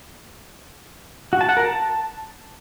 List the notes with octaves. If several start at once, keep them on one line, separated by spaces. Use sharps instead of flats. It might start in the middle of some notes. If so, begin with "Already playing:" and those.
F#4
A5
F#5
A#4
A5